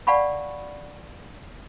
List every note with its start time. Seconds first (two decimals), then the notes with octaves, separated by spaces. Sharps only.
0.07 D5 F5 F#5 A5 B5 C#6